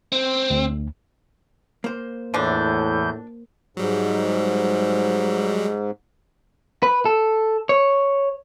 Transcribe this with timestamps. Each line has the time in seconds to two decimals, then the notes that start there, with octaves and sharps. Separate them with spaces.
0.12 C4
0.50 D2
1.84 A#3 C5
2.34 E2 A2 E3 F3 D4 G6
3.77 G#2 F#3 G3
6.83 B4
7.05 A4
7.69 C#5